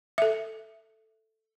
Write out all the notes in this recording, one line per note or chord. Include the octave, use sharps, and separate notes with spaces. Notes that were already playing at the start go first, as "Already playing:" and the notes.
A4 E5